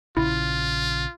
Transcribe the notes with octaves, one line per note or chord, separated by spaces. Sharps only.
A#1 C#3 E4 F4